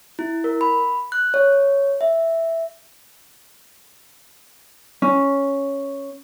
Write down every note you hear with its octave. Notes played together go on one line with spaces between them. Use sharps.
E4
A#4
B5
F#6
C#5
E5
C#4